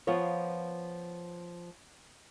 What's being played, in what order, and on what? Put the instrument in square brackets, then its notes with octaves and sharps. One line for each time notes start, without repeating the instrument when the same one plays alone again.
[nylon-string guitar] F3 B3 F4 C#5